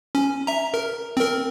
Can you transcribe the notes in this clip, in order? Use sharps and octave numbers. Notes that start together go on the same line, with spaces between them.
C#4
E5 A#5
A#4
C4 A#4